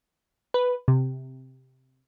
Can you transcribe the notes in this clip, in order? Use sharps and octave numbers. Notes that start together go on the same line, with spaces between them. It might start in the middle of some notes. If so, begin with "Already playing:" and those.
B4
C3